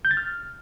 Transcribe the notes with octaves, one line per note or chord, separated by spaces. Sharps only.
G6
A6
F6